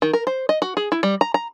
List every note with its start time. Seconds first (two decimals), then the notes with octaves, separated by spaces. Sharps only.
0.02 D#3
0.13 A#4
0.27 C5
0.49 D#5
0.62 F#4
0.77 G#4
0.92 E4
1.03 G3
1.21 A#5
1.34 A#5